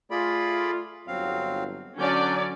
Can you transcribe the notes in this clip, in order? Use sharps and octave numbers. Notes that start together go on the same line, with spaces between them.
A3 F4 G#4 D5 B5
G1 F#3 C4 F5
D3 F#3 C#4 D4 D5 G6